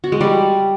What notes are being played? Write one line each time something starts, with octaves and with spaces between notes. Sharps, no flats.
F#4
G#3
G3